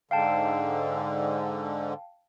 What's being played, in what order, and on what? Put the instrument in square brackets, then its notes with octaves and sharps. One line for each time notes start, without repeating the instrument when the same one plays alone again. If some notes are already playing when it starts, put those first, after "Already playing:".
[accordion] G#2 D3 [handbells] F5 G5 A5